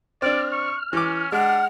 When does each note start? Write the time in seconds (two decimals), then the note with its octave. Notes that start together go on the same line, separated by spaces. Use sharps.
0.22 C4 D4 D5 F6
0.52 C#6
0.93 E3 C#4 D6
1.32 G#3 D4 F#5